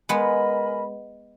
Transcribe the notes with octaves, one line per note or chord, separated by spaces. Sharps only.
G#3 B3 A#4 D#5 G#5 B5